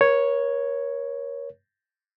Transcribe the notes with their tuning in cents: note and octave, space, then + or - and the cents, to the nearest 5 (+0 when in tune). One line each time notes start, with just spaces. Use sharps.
A#4 +35 C#5 +0